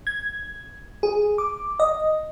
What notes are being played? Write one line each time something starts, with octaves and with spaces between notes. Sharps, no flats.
G#6
G#4
D6
D#5